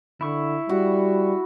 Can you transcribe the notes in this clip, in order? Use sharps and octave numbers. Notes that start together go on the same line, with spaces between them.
D3 E4 C#6
G3 F#4